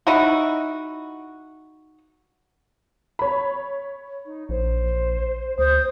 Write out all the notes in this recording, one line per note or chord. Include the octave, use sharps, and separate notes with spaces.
D#4 E4 F#4
C#5 B5
D#4
A#1 C5
D2 C5 D#6